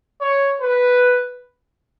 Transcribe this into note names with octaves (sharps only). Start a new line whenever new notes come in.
C#5
B4